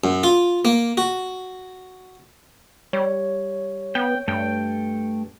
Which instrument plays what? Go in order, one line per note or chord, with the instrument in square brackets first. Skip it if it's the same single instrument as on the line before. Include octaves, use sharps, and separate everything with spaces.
[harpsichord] F#2
F4
A#3
F#4
[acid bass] G3 [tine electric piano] C#5
[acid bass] B3 [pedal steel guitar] G5
[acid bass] G2 [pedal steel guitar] A3 G5